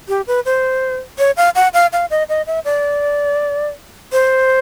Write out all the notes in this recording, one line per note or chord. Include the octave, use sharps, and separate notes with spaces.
G4
B4
C5
C#5
F5
F#5
F5
F5
D#5
D#5
E5
D5
C5